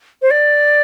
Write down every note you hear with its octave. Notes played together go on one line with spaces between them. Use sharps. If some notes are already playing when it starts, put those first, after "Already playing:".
C5
D5